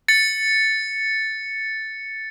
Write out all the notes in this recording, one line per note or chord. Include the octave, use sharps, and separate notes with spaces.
A6 C#7